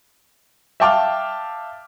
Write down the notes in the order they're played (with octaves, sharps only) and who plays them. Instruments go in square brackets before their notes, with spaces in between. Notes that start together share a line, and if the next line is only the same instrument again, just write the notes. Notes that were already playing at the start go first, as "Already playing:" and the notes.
[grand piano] E5 F5 G5 A5 D6 F6